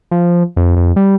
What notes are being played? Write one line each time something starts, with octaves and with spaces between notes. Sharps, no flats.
F3
F2
F2
G3